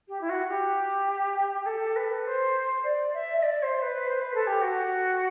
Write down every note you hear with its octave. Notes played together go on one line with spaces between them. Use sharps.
G4
E4
F#4
G4
G4
A4
B4
C5
D5
E5
E5
D5
C5
B4
C5
B4
A4
G4
F#4